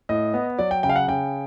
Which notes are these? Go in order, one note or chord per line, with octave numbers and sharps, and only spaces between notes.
A2 D#5
B3
F#3 D5
G5
C#3 G5
F5
F#5
C#3 G5